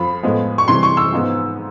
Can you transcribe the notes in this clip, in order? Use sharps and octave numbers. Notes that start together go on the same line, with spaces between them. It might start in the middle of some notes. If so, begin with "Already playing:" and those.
Already playing: F2 F3 B5
A2 F3 G#3 B3
C#6
C3 E3 G3 C6
C#6
E6
G#2 F3 G#3 B3